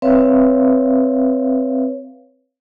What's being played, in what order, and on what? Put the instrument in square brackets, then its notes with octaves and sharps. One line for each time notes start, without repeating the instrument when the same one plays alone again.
[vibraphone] C4 B4 C#5 E5 F5